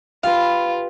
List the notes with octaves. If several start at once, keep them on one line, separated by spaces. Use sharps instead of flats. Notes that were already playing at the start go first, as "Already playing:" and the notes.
F4 G4 B4 F5